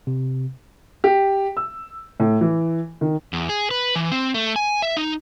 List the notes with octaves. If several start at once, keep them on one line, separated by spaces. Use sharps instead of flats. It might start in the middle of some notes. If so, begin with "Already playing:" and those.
C3
G4
E6
A2
E3
D#3
E2
G#4
B4
E3
C4
A3
G#5
E5
D#4